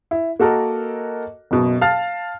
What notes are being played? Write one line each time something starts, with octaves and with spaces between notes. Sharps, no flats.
E4
A#3 F#4 A4 A#4 D#5
F#1 B2
F5 A5 F6 A6